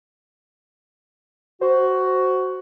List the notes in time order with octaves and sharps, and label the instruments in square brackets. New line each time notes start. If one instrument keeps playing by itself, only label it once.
[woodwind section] F#4 [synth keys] C5